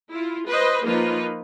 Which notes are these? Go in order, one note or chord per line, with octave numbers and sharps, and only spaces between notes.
E4 F4
B4 C5 D#5
F3 A#3 D#4 F4 B4